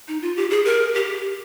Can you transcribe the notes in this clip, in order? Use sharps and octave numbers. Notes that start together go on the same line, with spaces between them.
D#4
F4
G4
G#4
A#4
G4